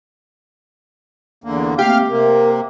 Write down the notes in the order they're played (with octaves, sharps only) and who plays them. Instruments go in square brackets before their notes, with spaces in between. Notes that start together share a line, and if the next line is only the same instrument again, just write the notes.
[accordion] E2 D3 A#3
[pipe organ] A3 A#3 C4 [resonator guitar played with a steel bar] G4 [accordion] F5 F6
[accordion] C3 A#3 [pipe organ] A#4